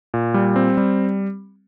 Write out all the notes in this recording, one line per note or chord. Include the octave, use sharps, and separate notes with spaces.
A#2
G3
C4
G3